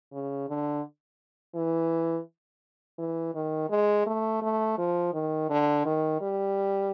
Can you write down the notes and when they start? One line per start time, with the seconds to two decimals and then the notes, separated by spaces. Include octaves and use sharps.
0.13 C#3
0.49 D3
1.55 E3
2.98 E3
3.35 D#3
3.70 G#3
4.06 A3
4.42 A3
4.78 F3
5.14 D#3
5.50 D3
5.86 D#3
6.21 G3